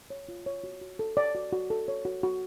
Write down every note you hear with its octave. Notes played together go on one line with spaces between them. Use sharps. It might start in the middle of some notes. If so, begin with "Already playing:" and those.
C#5
F4
C#5
F#4
F#4
A4
C#5 D5
F#4
F#4
A4
C#5
F#4
F#4